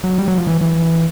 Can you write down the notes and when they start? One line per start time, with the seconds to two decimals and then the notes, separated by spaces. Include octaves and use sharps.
0.04 F#3
0.18 G3
0.28 F#3
0.38 F3
0.47 E3
0.61 E3